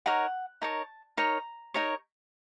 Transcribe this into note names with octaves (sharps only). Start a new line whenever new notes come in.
D#4 A#4 C#5 F#5
D#4 A#4 C#5 A5
D#4 A#4 C#5 A#5
D#4 A#4 C#5